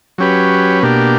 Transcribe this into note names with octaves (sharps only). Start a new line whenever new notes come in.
F#3 C#4 G4 B4
B2 A#3 D4 G4